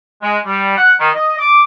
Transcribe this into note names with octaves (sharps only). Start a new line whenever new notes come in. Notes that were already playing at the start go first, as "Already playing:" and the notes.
G#3
G3
F#5
D#3
D#5
D6